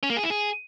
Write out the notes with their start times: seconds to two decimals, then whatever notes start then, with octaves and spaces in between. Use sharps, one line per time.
0.03 C#4
0.10 A#3
0.17 G#4
0.23 E4
0.30 G#4